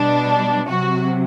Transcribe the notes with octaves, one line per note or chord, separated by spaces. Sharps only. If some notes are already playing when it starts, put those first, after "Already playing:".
Already playing: B2 G3 D4
C3 F#3 F#4